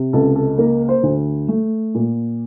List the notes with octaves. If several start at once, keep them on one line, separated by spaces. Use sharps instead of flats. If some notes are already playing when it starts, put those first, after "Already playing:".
Already playing: C3
C#2 A4
A4
A#3 A#4
C5
D2
A3
A#2